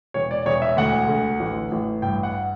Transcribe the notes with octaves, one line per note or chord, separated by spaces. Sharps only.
E1 C#5
D5
E1 C#5
E5
D2 F#5
D3
A1
A1
G2 G5
F#5